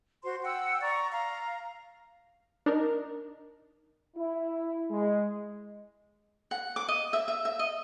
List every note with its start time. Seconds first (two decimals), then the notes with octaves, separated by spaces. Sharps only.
0.24 F#4 C5 C6
0.43 F#5 G5 E6
0.81 D5 A#5 C#6
1.11 F5 A#5
2.66 D4 D#4 A#4
4.16 E4
4.89 G#3
6.51 F#5
6.76 D6
6.88 D#5
7.13 E5
7.28 E5
7.45 E5
7.59 D#5